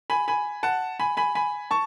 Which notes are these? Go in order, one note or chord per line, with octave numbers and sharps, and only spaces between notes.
G#5 B5
G#5 B5
F#5 A5
G#5 B5
G#5 B5
G#5 B5
A5 C#6